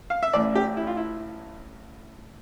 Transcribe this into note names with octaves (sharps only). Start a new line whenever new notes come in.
F5
E5
A1 A2 E3 D5
G4
E4
F4
E4